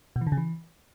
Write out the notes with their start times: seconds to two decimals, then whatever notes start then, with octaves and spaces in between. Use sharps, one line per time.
0.16 B2
0.21 E3
0.27 D3
0.32 C#3
0.37 E3